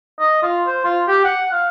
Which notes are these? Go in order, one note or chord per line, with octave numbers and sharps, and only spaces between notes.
D#5
F4
C5
F4
G4
F#5
F5